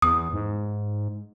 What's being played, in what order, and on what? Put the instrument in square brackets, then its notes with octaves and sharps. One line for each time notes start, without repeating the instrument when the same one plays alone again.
[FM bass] E2 [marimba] D#6
[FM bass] G#2